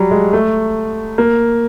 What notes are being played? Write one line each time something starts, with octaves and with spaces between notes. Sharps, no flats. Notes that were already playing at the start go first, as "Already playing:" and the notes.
Already playing: F#3 G3
G#3
A3
A#3